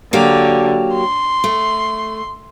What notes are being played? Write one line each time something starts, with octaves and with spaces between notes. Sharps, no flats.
D3 F#3 A#3 G4
C6
A3